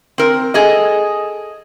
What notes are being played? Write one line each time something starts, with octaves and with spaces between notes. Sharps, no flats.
C4 A#4
G#4 A4 D#5